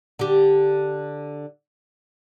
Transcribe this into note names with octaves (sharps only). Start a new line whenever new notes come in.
D3 G4